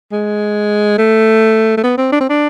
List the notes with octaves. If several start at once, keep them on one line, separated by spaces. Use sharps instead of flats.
G#3
A3
A3
B3
C4
D4
C4
D4